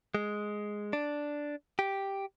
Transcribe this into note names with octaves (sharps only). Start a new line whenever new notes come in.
G#3
D4
G4